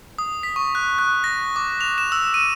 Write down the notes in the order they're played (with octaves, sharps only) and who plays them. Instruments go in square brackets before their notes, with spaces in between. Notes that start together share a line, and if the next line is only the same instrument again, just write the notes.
[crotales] D#6
B6
C#6
F#6
F#6
A#6
D6
F7
E7
E6
D#7